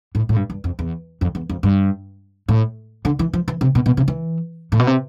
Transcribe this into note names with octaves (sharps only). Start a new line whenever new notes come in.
A2
A2
G2
G2
F2
E2
F2
E2
F2
G2
A2
D3
E3
F3
E3
C3
B2
B2
C3
E3
A2
B2
C3